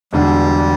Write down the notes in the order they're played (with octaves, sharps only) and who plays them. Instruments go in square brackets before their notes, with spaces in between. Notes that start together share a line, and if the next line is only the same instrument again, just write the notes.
[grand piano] E1 E2 D3 [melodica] G3